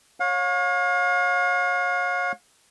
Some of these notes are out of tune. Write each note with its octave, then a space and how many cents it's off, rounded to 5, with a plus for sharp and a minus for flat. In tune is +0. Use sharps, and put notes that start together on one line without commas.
C#5 -15 F5 +40